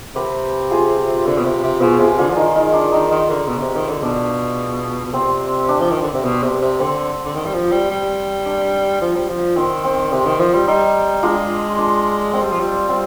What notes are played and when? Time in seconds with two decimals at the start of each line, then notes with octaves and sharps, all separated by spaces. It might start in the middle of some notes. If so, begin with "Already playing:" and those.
0.15 C3 G4 B4
0.71 F4 G#4
1.26 D3
1.38 B2
1.45 C3
1.63 C3
1.81 B2 F4 G#4
2.00 C3 F4 G#4
2.19 D3 D4 F4
2.30 F3
2.37 D#3 D#4
2.55 D#4
2.73 D4
2.92 D#3 D#4
3.11 D#3
3.30 D3
3.47 B2
3.58 D3
3.62 C3
3.76 D#3
3.89 D3
4.03 B2 D4
5.05 B2
5.13 C3 C4
5.69 D4
5.81 F3
5.91 D#3
6.02 D3
6.13 C3
6.24 B2
6.43 C3
6.61 C3
6.80 D3 C4
7.25 D3
7.35 D#3
7.46 G3
7.54 F3
7.72 G3
7.91 G3
8.46 D4
9.01 F3
9.16 G3
9.29 F3
9.56 D#3 C4
9.84 C4
10.12 C3 C4
10.26 D#3
10.40 F3
10.54 G3
10.67 G3 D#4
11.23 G#3 D4 F4
11.78 D4
12.33 G#3 C4
12.42 G3
12.52 F3
12.60 G3
12.89 G3 C4